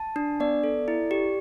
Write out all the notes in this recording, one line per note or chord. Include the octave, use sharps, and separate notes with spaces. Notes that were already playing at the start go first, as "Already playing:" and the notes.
Already playing: A5
D4
B3 D5
A4
E4
G4